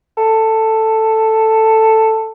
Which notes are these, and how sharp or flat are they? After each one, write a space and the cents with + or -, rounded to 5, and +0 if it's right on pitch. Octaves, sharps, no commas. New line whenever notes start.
A4 +10